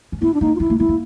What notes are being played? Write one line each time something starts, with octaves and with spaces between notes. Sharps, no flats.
C#4
B3 E4
D4
A#3 D#4
F4
B3 E4
A#3
B3 E4
A#3